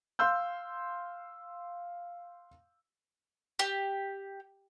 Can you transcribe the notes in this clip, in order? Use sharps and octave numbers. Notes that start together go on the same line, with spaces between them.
F5 C6 E6 G6
G4